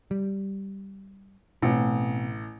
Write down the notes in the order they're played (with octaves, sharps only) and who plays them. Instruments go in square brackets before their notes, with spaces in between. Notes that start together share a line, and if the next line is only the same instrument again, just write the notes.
[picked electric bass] G3
[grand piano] A1 [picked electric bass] B2 C4